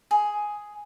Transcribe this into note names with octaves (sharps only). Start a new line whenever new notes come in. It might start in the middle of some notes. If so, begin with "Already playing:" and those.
G#4